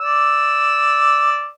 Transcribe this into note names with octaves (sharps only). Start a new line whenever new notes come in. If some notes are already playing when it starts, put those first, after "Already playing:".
D5 E6